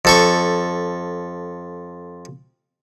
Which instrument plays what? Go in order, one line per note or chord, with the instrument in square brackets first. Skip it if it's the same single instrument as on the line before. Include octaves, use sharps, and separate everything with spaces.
[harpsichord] F2 A4 C#6